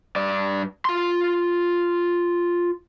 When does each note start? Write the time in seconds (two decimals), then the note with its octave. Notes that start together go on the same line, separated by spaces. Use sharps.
0.16 G2 D5
0.85 F4 C6